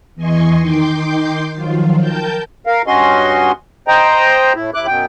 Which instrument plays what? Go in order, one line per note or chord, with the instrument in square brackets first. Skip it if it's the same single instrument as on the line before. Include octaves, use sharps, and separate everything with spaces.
[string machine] E2 E3 D#5 G#5 C6 C#6
D#3 D#4 G5 C6 D6 G6
D#3 F3 F#3 F4
A#4 G5 A5 G6
[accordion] A#4 F5
G2 C#4 F#4 D#5 C6
C5 D#5 G5 A#5
A2 E4
D#2 E4 D6 F#6
F#2 B2 G5